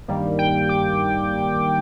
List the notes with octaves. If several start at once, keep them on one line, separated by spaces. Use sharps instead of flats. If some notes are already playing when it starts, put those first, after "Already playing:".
G2 D#3 G3 A#3
G5
D6